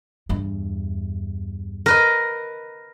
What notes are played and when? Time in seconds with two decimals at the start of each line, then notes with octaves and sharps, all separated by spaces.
0.29 E2 G2
1.86 A#4 B4 D#5